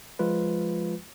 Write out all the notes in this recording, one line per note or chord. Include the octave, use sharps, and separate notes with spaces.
F3 G#3 F4 B4